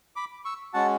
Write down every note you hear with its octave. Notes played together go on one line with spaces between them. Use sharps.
B5 D6
C#6 E6
G#3 C#4 F#4 F#5 A5